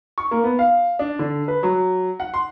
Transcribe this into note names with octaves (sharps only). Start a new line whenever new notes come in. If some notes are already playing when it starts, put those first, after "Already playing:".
C#6
A#3
B3
F5
D4
D3
B4
F#3
F#5
C6